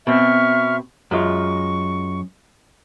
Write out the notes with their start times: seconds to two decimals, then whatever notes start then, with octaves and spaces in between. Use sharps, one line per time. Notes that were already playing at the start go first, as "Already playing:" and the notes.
0.07 B2 C4 E5 C#6 F6
1.11 F#2 G#3 F4 C#6